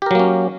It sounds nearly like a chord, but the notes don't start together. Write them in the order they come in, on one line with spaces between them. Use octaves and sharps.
G4 A#4 F#3 A#3 C#4